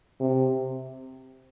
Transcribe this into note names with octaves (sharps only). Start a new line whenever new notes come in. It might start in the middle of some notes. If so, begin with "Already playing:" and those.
C3